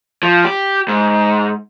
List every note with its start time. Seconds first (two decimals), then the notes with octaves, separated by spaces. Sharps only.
0.23 F3
0.45 G4
0.88 G#2